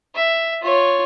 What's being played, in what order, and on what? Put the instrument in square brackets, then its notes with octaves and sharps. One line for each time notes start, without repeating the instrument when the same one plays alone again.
[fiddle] E5
F4 C#5